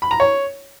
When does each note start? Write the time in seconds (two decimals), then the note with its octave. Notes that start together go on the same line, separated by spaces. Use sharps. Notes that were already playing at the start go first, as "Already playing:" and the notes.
0.02 B5
0.11 A#5
0.20 C#5